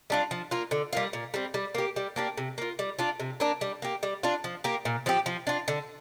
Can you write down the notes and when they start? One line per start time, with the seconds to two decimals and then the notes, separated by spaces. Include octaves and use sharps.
0.10 G3 D4 F4
0.31 F3
0.51 A#3 F4
0.71 D3
0.93 G3 A#3 F4
1.13 A#2
1.34 G3 C4
1.54 G3
1.75 A#3 G4
1.96 G3
2.16 A#3 D4 G4
2.37 C3
2.58 A#3 F4
2.79 G3
2.99 D4 F4
3.20 C3
3.40 A#3 D4
3.61 G3
3.82 A#3 G4
4.03 G3
4.23 D4 F4
4.44 F3
4.64 A#3 G4
4.85 A#2
5.06 F3 C4 G4
5.26 F3
5.47 D4 F4
5.68 D3